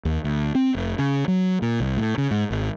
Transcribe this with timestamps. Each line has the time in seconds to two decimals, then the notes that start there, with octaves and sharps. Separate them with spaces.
0.05 D#2
0.24 D2
0.55 C4
0.75 F1
0.99 C#3
1.28 F#3
1.62 A#2
1.80 C2
1.97 A2
2.18 C#3
2.31 G#2
2.50 G#1